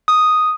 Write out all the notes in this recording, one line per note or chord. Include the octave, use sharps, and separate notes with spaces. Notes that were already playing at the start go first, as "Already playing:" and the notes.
D#6